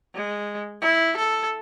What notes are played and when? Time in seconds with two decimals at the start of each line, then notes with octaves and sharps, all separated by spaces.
0.15 G#3
0.81 E4
1.17 A4